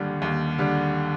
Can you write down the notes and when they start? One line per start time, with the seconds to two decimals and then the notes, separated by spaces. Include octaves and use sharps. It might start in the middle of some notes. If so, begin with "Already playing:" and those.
Already playing: D#2 D3 G3
0.22 D#2
0.58 D3 G3